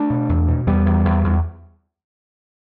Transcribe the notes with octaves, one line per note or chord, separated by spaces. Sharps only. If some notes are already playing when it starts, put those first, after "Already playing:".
Already playing: A3 D4
B2
E2
B2
E2 G3 B3
E2
E2
E2